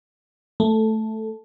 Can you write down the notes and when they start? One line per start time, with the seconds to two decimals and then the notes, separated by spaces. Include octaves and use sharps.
0.60 A3